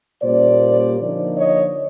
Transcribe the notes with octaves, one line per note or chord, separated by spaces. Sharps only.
A#2 G3 A#3 C#4 C5 D5
D3 F3 A#3 D#4
C#5 D#5